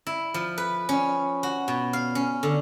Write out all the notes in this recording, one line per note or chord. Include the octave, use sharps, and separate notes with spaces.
E4
F3
B4
C#4
F#4
B2
F5
C#4
D3